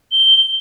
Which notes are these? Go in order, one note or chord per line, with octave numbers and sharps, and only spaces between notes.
G7